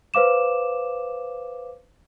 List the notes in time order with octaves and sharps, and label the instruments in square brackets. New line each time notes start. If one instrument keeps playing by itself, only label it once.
[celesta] B4 C5 F5 D6 E7